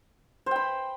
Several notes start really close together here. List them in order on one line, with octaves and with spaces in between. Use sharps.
C5 G5 B5